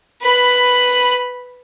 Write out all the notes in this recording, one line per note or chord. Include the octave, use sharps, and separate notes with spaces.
B4 B5